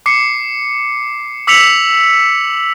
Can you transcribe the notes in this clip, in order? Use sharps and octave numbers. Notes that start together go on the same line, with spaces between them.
D6 C7 C#7
D6 E6 B6 C#7 F7 F#7